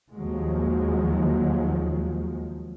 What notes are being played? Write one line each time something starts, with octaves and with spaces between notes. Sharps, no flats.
D#2 F3 F#3 G#3